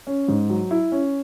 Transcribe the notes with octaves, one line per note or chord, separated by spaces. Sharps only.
C#4
G#2
F#3
E4
C#4